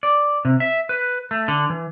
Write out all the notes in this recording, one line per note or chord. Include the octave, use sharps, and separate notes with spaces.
D5
C3
E5
B4
A3
D3
E3